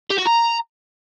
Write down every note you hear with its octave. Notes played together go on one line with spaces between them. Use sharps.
G4
F#4
A#5